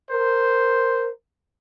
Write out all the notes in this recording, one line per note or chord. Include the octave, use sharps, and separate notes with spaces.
A#4 C5